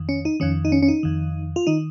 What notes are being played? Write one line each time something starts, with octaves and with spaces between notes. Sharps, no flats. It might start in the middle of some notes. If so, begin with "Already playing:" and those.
Already playing: F2 D#3
C#4
D#4
F2 D#3 C#4
D#4
C#4
C#4
D#4
F2 D#3
F4
D#3 D#4